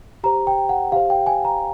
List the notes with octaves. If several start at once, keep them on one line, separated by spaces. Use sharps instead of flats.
G4 C5 A#5
G5
F#5
G4 C5 F5
G5
G#5
A#5